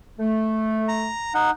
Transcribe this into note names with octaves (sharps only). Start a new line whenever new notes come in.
A3
A#5
D#4 F#5